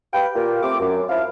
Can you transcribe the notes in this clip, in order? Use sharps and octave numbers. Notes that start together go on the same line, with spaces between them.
G4 B4 F5 G5
A#2 A#3 F4 G4
A3 C4 D6
F#2
F3 E4 F5